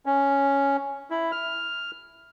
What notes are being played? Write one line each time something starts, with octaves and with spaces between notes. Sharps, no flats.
C#4
E4
F6